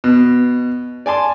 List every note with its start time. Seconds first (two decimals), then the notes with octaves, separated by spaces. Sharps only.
0.04 B2
1.06 D5 G#5 A5 C6